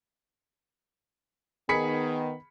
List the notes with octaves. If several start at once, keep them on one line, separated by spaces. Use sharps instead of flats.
D#3 B3 G#4 B5 B6 C#7